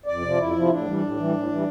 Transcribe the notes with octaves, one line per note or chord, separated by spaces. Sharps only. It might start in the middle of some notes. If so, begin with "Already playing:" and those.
F2 D5
C3 F3
F2 E4
C3 F3
A2 D4
E3 G3
A2
E3 G3
A2
E3 G3